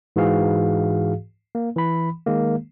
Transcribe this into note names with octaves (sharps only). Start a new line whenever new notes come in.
G#2 E3 F#4 G#4 F5
A#3
E3 B5
D#3 G#3 A#3